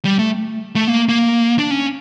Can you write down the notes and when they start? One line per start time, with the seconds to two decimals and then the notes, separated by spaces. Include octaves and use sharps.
0.05 G3
0.19 A3
0.76 A3
0.88 A#3
1.09 A#3
1.59 D4
1.71 C#4